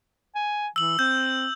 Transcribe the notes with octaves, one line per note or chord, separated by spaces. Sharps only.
G#5
E3 E6 F#7
C4 G6